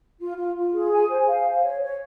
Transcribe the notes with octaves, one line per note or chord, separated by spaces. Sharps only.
F4
F4
F4
G#4
G#5
C5
F5
C5
C#5
C#5